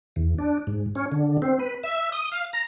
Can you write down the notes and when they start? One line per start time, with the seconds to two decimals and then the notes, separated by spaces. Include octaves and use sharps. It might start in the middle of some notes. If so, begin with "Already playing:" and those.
0.16 E2
0.38 D4
0.67 G#2
0.95 C#4
1.12 D3
1.42 C4
1.59 B4
1.83 E5
2.12 D#6
2.32 F5
2.53 A#5